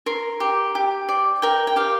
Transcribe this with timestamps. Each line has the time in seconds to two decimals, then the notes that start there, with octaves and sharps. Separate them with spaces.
0.06 A#4 C6
0.40 G4
0.75 G4
1.09 D5
1.42 A#4 G5
1.67 G5
1.76 G4 F5